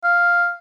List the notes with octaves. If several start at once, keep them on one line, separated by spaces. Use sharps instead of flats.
F5